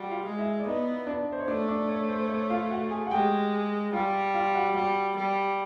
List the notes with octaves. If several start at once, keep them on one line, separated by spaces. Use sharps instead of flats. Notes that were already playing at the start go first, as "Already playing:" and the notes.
Already playing: G3 F#4
F4 F5
G#3
E4 E5
D5
B3 D#4 D#5
D4 D5
C5
C#5
A3 D4 D5
D4 D5
C#5
C5
C5
C#5
F4 F5
F#4 F#5
G#4 G#5
F#5
G#3 G4 G5
G3 F4 F5
F4 F5
F#4 F#5
G3 F#4 F#5
G3